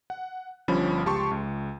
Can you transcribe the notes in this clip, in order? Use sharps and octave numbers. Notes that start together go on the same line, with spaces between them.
F#5
G1 G2 F3 C#4 B5
C#2 G4 A5 C6 C#6
C#2